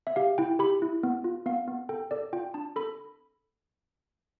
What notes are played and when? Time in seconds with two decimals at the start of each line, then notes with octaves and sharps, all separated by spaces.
0.07 E5
0.16 G4 F5
0.38 E4 G5
0.59 G4 B5
0.82 E4
1.03 B3
1.24 F4
1.46 B3 F5
1.68 B3
1.89 A4 G5
2.11 A4 D5
2.33 F4 G5
2.54 D4 A5
2.76 A4 B5